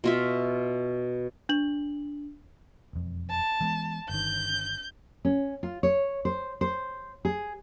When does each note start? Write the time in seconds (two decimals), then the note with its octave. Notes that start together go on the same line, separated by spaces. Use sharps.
0.04 B2 F4 E5
1.49 D4 F#7
2.93 E1 F2
3.30 A5
3.61 E3 G#3 B3
4.09 G1 D#3 G6
5.25 C#4
5.63 F4
5.83 C#5
6.25 C5
6.61 C5
7.25 G#4